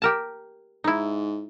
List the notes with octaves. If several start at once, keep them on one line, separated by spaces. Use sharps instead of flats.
G4 A#4 A5
G#2 D#4 E4